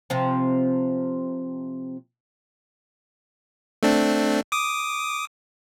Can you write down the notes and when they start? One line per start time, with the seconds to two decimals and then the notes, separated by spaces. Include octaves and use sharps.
0.10 C3 F3 C4
3.83 A3 C4 D4
4.52 D6 D#6